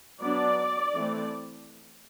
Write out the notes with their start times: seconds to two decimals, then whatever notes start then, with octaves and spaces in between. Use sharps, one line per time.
0.21 F#3 B3 D4 D5
0.94 E3 A3 C4